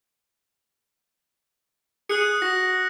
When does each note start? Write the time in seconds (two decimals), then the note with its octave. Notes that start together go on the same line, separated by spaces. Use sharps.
2.10 G#4 D#6 F#6 C#7
2.42 F#4 A#6